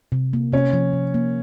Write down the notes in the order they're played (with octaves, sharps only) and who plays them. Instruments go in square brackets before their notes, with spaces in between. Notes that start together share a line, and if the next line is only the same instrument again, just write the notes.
[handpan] C3
A#3
[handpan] C3 [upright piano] C#4
[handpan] F3
C3
A#3